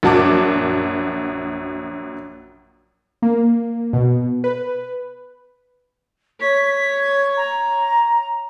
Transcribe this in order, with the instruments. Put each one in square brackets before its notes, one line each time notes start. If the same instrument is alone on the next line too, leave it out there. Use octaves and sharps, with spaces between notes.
[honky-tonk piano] A#1 F#2 F#4 A5 D6
[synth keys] A#3
B2
B4
[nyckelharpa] C#5 [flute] B6
[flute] G#6
A#5